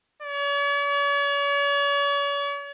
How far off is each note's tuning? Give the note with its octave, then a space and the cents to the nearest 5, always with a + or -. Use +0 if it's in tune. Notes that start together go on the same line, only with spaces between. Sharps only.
C#5 +45